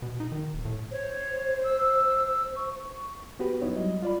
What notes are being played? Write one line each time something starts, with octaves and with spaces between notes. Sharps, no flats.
B2
D#4
D#3
D#1
A2
C5 C#5
E6
C#6
B3 F#4 G4 B4
F#2 B3 D#4 E4 C#5
F#3 G3 E4 D#5
F4 D5 B5